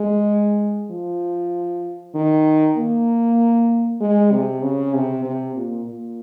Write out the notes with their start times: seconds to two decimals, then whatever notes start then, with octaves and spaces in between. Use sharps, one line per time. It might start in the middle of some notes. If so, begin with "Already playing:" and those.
Already playing: G#3
0.91 F3
2.15 D#3
2.77 A#3
4.01 G#3
4.32 C3
4.63 C#3
4.94 C3
5.25 C3
5.56 A#2
5.86 A#2